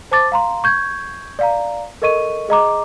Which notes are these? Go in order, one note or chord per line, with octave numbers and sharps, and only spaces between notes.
C5 A5 D6 A6
F5 A#5 C6
C#6 G6 G#6
D5 F5 A#5
A4 A#4 D#5 C#6 D#7
G#4 D#5 A#5 D6